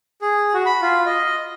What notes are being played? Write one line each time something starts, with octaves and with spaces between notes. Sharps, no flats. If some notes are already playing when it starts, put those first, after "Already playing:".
G#4
F#4
B5
F4
D#5